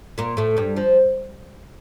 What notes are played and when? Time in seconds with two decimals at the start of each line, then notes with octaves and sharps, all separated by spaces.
0.18 A#2 A#3
0.37 A2 A3
0.57 G2 G3
0.77 F3